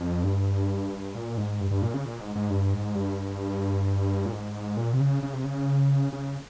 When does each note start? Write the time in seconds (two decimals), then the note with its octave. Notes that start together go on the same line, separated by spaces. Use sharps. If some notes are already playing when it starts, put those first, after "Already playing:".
Already playing: F2
0.23 G2
1.15 A#2
1.38 G#2
1.60 G2
1.71 G2
1.82 A#2
1.94 C#3
2.05 A#2
2.20 G#2
2.35 G#2
2.50 G2
2.74 G#2
2.95 G2
4.26 A#2
4.32 G#2
4.77 A#2
4.93 C3
5.00 C#3
5.23 C#3
5.33 C3
5.44 C#3
6.13 C#3